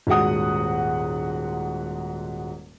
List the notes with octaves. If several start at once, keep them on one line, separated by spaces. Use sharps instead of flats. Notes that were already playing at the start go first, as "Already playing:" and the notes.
D#1 G#2 G#3 F#4 F#5 D#6